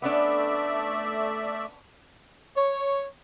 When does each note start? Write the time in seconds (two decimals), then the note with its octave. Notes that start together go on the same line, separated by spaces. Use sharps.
0.02 A3 B3 C#4 D4 D5 E5
2.56 C#5